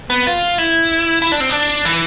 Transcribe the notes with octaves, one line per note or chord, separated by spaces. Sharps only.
B3
F4
E4
E4
D4
C4
D4
E3